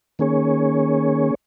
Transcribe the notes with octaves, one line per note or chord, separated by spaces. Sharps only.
D#3 A#3 C#4 G#4 C#5